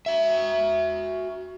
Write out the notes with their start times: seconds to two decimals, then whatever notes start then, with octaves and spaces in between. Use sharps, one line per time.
0.06 F#4 E5